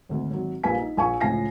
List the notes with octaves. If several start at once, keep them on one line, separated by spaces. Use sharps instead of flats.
G#1 D2
G#1 F#3
A#1 G3 A#3 B4 G#5 B6
D#4
A#1 G#5 C#6
C#2 A2 F3 G#5 A#6 C7